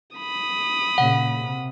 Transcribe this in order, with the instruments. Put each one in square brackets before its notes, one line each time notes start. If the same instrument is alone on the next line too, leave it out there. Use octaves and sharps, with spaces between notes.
[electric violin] B5 D#6
[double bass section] A#2 C#3 A#3 [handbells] F#5
[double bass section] C3